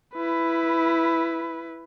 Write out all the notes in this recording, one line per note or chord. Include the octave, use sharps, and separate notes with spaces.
E4 B4